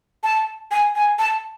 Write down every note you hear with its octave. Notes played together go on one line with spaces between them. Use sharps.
A5
G#5
G#5
A5